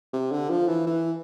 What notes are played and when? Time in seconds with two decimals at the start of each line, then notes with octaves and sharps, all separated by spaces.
0.13 C3
0.32 D3
0.50 F3
0.68 E3
0.86 E3